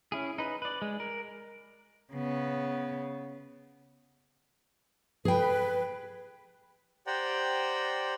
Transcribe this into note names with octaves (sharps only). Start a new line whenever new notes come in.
C#4 E4 G#4
D#4 B4
B4 D5
G#3
A#4
C#3 B3
G#4 B4 G5
G4 C5 D5 F#5 G5 A#5